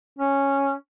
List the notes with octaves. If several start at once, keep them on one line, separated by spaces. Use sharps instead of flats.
C#4